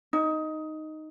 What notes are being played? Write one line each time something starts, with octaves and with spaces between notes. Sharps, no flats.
D#4